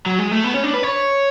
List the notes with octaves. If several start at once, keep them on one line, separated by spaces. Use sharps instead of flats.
F#3
G#3
A3
B3
C#4
D4
B4
C#5